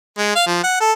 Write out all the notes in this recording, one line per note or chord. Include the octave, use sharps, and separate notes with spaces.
G#3
F5
F3
F#5
A4